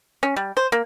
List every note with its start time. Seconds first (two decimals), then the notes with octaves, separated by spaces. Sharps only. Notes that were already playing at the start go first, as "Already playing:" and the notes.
0.23 C#4
0.36 G3
0.57 C5
0.72 A#3